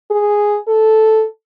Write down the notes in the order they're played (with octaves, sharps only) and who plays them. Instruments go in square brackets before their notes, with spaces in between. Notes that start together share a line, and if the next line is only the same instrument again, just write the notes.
[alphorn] G#4
A4